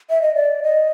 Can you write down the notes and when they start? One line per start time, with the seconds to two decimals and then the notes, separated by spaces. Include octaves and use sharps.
0.10 E5
0.22 D#5
0.35 D5
0.63 D#5